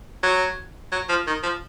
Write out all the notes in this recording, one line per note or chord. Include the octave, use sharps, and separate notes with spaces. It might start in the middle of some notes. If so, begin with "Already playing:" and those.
F#3
F#3
F3
D#3
F3